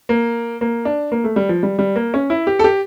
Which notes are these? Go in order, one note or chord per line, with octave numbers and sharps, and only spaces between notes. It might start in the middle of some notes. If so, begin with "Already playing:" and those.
A#3
A#3
D4
A#3
A3
G3
F3
G3
G3
A#3
C#4
E4
G4
A4
G4